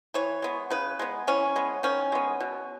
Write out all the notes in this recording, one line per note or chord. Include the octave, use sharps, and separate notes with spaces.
E3 C#5
G#3 B3
C#3 B4
G#3 B3
E3 C#4
G#3 B3
D#3 C#4
G#3 B3
B2